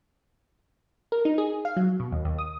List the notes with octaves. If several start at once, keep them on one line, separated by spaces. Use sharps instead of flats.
A#4
D#4
G#4
F5
F#3
B2
D#2
D#2
D#6